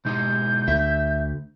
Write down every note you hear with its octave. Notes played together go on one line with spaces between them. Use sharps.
B2 G#3 D#4 G6
D2 E5